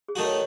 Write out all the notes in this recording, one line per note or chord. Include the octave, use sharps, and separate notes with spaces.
G#4
D#3 A3 D#4 F#4
C#5